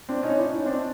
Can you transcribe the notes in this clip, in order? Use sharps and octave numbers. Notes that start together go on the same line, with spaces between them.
C4 D4
C#4 D#4
D4 E4
C#4 D#4
C4 D4